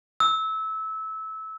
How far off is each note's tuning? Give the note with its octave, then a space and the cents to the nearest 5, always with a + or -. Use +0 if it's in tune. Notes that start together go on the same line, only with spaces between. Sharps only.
E6 -20